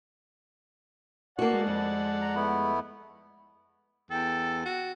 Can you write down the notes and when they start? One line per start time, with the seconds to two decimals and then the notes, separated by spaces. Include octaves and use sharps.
1.39 A#3 F#4 D5 F#5 A5
1.53 G#3
1.67 F2
2.21 A#5
2.35 A3 B3 E4
4.11 E2 A4 G5
4.66 F#4